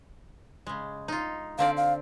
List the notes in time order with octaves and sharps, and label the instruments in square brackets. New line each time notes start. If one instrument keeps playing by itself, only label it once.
[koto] C#3 G#3
D#4 F4
[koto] D3 C4 D5 [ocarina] F5
[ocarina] F5